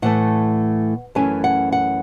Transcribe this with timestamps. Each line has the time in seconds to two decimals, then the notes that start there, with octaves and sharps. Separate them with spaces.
0.02 A2 E3 A3 F#5
1.15 F#2 E3 A3 C#4 G#5
1.44 F#5
1.72 F#5